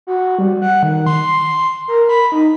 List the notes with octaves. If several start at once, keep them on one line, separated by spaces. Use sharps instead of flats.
F#4
G3
F#5
D#3
C6
A#4
B5
D#4